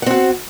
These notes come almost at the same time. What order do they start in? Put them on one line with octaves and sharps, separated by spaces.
F#5 C4 F#4